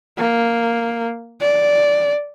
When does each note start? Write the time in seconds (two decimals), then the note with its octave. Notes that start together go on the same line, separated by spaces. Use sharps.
0.18 A#3
1.40 D5